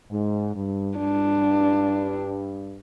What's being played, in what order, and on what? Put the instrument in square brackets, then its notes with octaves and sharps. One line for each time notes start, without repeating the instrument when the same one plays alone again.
[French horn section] G#2
G2
[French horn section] G2 [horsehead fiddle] D4